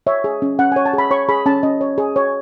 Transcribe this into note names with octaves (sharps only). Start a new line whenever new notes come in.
C#5 E5
G#4
C#4
C#4 F#5
C#5 G#5
A5
G#4 B5
C#5 C#6
G#4 B5
C#4 A5
C#4 D#5
C#5
G#4
C#5